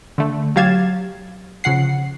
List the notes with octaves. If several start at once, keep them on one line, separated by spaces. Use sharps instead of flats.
D3 A3
F#3 G4 F5 G#6 A6 E7
C#3 F3 F#5 C7